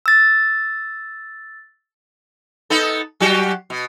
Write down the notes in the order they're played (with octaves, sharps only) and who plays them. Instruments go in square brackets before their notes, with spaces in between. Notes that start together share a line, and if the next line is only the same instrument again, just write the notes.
[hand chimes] E6 A6
[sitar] B3 D#4 A4
F#3 F#4 G4
B2